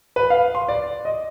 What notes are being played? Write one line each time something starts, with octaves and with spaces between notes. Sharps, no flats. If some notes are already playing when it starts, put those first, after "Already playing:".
B4
F5
C6
D5
D#5